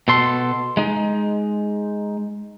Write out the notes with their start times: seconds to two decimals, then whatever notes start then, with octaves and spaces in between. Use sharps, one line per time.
0.08 B2 A4 C6
0.77 G#3 D#4